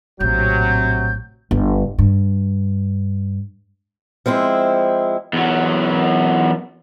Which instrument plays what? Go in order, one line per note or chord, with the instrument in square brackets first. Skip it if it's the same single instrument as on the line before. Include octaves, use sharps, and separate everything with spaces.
[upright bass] A#1 A2 [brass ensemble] C3 F#3 [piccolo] G6
[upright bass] G1
G2
[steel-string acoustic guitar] F3 G#3 C4 E4
[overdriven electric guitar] E2 F#3